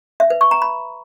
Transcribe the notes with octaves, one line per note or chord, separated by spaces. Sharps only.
E5
B4
C#6
A#5
B5